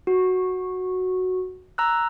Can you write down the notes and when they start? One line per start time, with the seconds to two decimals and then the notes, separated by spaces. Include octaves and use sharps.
0.07 F#4
1.78 A#5 E6 F#6